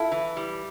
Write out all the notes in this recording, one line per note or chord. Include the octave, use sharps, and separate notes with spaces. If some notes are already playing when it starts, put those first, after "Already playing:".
Already playing: E4 F4 A4
E3
G3